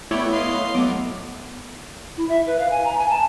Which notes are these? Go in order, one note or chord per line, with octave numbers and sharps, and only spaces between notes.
A3 B3 E4 C#5 D5 G5
D#5 F5 C6
F#3 A3 B3 D6
E4
E5
B4
F5
G#5
A#5
G#5
A5